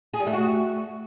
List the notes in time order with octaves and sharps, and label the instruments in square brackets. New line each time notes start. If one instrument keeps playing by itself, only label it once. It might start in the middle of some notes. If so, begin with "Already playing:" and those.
[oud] G#4
G3
A3
F#4